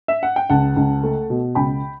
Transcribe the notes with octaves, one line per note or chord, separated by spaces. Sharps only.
E5
F#5
G5
C#2 F#5 A5
C#2
A3
B2
C#2 G5 B5